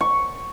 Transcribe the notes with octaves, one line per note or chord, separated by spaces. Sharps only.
C#6